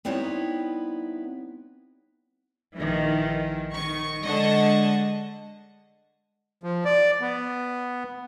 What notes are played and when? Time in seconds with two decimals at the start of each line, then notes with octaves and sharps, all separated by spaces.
0.05 G3 B3 C4 D#4 E4 C#5
2.76 A#1 D#3 E3
3.74 D#3 C#6
4.24 D3 G#3 D#5 F#5 A5 C#6
6.63 F3
6.85 D5
7.21 B3